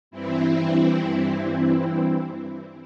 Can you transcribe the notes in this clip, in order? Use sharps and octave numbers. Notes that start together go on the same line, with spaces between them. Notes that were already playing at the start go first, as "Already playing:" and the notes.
G2 E3 C4 E4